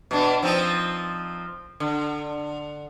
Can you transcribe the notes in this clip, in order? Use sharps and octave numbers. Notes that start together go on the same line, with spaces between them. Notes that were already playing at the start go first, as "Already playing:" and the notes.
B2 D4
F3 C4 D#4
D3